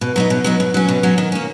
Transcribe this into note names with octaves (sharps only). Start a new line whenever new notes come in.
B2
F#3 B3 D#4
B2
F#3 B3 D#4
B2
F#3 C#4
B2
F#3 C#4
D#3
A#3 C#4